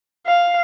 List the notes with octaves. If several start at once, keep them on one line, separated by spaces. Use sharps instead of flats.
F5